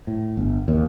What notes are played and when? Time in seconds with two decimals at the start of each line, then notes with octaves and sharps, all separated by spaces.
0.07 A2
0.37 G1
0.68 D#2